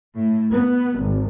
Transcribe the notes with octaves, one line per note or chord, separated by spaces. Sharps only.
A2
B3
G#1